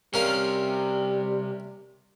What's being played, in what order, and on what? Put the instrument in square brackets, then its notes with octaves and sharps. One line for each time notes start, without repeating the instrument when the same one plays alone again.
[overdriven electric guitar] C3 [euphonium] G3 [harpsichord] C#4 A#4 F5